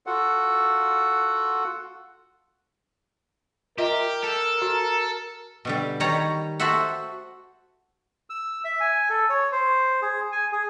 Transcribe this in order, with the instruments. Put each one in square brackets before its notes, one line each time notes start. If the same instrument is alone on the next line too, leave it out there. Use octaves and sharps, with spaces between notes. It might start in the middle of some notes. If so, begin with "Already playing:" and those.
[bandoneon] F4 F#4 A4 F#5
[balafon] F4 D#5 E5 [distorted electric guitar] G4 [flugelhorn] A#4
[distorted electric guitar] A4
[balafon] F#4
[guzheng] B2 D3 G3
D#3 G3 C#5 A#5
F#4 A4 C5 E5 F#5
[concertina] E6
E5
G#5
A4
C#5
C5
G#4
G#5
G#4